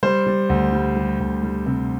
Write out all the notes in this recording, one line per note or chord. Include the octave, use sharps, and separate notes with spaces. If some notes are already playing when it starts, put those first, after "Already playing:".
G3 C5
G3
D2
G3
G3
D2
G3
C3